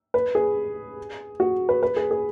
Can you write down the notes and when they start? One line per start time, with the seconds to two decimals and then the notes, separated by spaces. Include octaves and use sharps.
0.14 B4
0.35 G#4
1.40 F#4
1.69 B4
1.83 B4
1.96 G#4
2.11 G#4